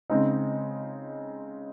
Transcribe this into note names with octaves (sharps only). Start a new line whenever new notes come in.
C#3 G#3 C4 D#4